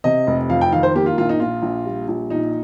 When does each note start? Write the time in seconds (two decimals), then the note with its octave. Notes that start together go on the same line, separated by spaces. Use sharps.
0.04 C3 D#5
0.27 F1
0.49 F2 F5
0.61 G5
0.72 D#3 F5
0.83 C5
0.94 A#3 G4
1.06 F4
1.18 A#1 F4
1.29 D#4
1.40 A#2 F4
1.62 A#1
1.85 G3
2.08 A#1
2.30 A#2 D#4